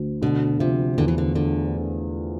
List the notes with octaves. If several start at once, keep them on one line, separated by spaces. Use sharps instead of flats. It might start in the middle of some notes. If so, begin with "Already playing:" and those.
Already playing: D2
B2 D3
C3 F3
E2 D3
E3
D3
D3